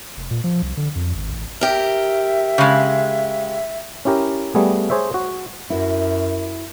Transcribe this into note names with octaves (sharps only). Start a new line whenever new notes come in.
F1
A#2
F3
C2
D3
F2
G#1
A1
G4 A#4 E5
C#3 G#3
C#4 E4 G4 A#4
G3 A3 B3 G#4
G#4 C5 C#5 E5
F#4
F#2 E4 F#4